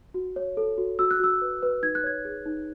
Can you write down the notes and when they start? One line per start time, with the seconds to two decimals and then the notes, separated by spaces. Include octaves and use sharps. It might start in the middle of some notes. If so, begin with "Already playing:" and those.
0.14 F#4
0.36 C#5
0.57 A4
0.78 F#4
0.99 F#4 E6
1.11 F#6
1.20 F#4 E6
1.42 B4
1.63 B4
1.82 D#4 G#6
1.95 F#6
2.04 C#5 G#6
2.25 G#4
2.46 D#4